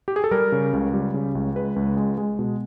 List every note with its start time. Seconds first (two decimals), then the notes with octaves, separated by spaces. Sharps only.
0.08 G4
0.16 G#4
0.24 A4
0.31 G3 A#4
0.52 C#3
0.73 C#2
0.94 G3
1.14 C#3
1.35 C#2
1.55 G#3 B4
1.76 C#2
1.97 G#3
2.18 G#3
2.39 B2